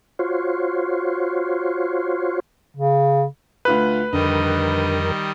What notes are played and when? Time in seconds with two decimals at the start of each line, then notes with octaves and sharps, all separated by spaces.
0.19 F4 F#4 C5 C#5
2.77 C#3
3.65 D2 F4 B4 F#6
4.13 F2 D3 D#3 G3 A#4 D#5